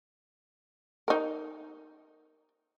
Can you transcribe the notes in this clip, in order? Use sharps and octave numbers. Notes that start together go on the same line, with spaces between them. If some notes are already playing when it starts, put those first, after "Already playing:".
D#4 A#4